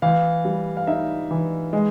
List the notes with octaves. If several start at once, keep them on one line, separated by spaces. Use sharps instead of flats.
E3 F5
G3
F5
D#4 E5
E3
G#3